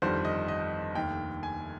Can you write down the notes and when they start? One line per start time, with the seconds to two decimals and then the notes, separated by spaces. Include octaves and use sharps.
0.02 G1 F2 D#3 G3 C5
0.25 D#5
0.48 D#5
0.95 F1 D#2 D#3 G5
1.43 G#5